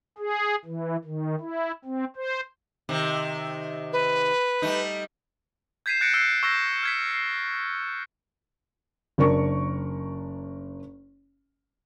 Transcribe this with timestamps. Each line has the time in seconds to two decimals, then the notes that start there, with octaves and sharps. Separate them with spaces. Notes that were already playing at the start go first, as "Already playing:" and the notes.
0.18 G#4
0.65 E3
1.04 D#3
1.40 E4
1.85 C4
2.16 C5
2.89 C3 D#3
3.93 B4
4.62 G3 A3 D#4
5.86 G6 G#6 B6 C7 D#7 E7
6.01 F#6 A6 A#6 C#7 D7
6.14 E6 C7
6.43 C#6 E6 G6 A#6 E7
6.83 F6 G#6 B6
7.11 C7
9.18 F#1 D4 A#4 C#6